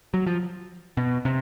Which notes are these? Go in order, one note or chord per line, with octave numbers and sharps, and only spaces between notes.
F#3
F3
B2
C3